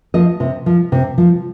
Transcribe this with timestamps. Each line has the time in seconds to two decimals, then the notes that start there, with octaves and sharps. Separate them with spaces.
0.14 F3 D#5
0.40 C3
0.66 F3
0.92 C3
1.18 F3